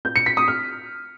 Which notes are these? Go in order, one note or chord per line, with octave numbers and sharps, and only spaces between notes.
G6
C#7
B6
D#6
F6